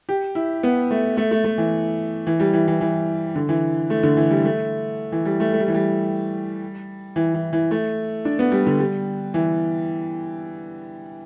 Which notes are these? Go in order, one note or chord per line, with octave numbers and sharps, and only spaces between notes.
G4
E4
B3
A3
A3
A3
A3
E3
E3
G3
E3
E3
E3
D3
E3
A3
D3
E3
G3
A3
E3
G3
A3
A3
G3
E3
G3
E3
E3
E3
A3
D4
B3
G3
D3
G3
E3